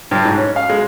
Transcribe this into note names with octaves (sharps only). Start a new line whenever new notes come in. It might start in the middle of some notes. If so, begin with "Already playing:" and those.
G2
G#2
C#4
F5
G#3